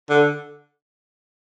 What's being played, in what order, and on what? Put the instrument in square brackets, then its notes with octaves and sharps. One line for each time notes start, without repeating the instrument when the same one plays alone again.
[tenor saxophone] D3